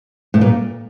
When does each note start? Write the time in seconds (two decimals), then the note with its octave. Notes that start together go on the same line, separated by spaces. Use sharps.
0.34 A2
0.41 A#2